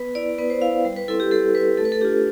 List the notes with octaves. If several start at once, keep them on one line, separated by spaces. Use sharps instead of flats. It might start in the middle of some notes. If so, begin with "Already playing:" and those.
Already playing: B3 B4
E4 D5
B3 B4
C5
E4 F5
G3
B4
C4 E4 A4
G4
G3 A4
C4 E4 B4
A3 A4
B4
A4
D4 F4 G4